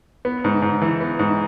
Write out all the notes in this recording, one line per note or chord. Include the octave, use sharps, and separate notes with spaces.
B3
G#2
G#2
E3
B3
G#2